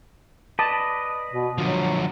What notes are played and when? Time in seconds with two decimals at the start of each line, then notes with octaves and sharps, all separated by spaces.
0.59 B4 D5 D#5 A5
1.34 B2
1.58 D3 F3 F#3